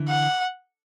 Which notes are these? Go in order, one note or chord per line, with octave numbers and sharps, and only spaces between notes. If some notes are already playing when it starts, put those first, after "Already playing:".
Already playing: D3 E3
F#5